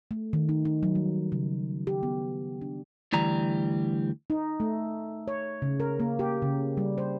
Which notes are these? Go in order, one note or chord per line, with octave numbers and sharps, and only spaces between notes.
A3
D#3
D#4
D#4
F#3
G3
C#3
G4
B3
D4
D2 E3 G3 A#5
D#4
A3
C#5
C#3
A#4
A#3
G4
C#3
G3
C5